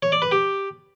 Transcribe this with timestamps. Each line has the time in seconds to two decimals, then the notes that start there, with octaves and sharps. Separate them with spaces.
0.02 C#5
0.12 D5
0.22 B4
0.32 G4